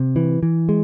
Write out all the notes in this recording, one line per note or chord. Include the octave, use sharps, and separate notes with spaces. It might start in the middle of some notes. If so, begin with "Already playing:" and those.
Already playing: C3
E3
E3
G#3